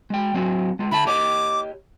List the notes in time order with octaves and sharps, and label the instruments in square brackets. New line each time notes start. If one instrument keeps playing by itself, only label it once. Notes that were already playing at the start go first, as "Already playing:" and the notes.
[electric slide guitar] G#3 G5
F#3 C4 F#4
G#3 F4
[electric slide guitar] D3 E5 A5 [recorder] B5
[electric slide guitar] G4 C#5 D#5 [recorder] D6